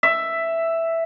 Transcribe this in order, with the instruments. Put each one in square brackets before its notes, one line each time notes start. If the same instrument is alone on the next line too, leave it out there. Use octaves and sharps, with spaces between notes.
[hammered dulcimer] E5